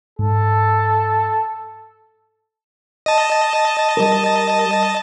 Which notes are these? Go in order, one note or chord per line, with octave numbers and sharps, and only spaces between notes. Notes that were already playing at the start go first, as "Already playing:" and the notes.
G#2 A4
D#5 A5
G3 A#4